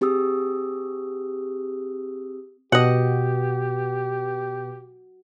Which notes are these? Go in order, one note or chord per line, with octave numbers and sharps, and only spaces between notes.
C4 G4 G#4 D#6 E6
B2 F#4 G4 D#5 F#5